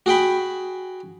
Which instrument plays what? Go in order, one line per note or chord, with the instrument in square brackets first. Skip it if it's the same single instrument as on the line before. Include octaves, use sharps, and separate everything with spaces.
[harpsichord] F#4 G#4 G5 B5